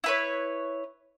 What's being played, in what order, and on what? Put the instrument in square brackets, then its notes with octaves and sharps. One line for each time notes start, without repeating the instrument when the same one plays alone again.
[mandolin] E4 B4 C#5